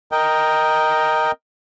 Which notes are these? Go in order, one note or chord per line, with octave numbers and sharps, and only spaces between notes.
A#4 D#5 G5